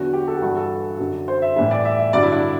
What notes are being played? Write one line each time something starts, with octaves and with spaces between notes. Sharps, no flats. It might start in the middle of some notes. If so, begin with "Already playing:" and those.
Already playing: E2 D3 F#3 F#4
G4
A4
G4
G2 E3 G3 F#4
A4
F#2 D3 F#3
C5
E5
A2 E3 G3 E5
D5
E5
E5
G2 D3 F#3 D5
E4
D4